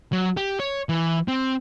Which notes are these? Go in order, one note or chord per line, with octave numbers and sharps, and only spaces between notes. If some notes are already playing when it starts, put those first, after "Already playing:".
F#3
G4
C#5
E3
C4